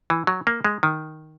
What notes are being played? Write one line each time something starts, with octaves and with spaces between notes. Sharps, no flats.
E3
F#3
A#3
G#3
D#3